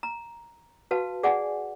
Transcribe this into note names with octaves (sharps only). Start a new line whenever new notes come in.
A#5
F#4 B4 F5 A5
G#4 D5 F#5 G#5